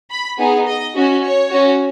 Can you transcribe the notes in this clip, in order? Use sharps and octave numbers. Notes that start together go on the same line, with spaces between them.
B5
B3 D#4 G#4
D#5
C#4 F#4
C#5
C#4 F#4